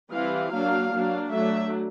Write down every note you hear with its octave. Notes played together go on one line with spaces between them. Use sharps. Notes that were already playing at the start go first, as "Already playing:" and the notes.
E3 G3 C4 F5
F#3 A#3 D4 F5
F#3 A#3 D4
F#3 A3 D4 E5